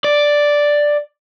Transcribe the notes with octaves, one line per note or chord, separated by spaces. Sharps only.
D5